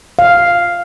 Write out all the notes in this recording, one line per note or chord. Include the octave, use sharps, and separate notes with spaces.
F5